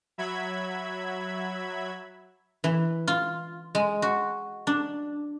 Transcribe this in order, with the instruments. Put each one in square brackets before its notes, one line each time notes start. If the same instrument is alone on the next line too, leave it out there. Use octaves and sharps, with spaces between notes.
[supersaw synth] F#3 E5 B5 G#6
[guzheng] E3
F4
G#3
F#4
D4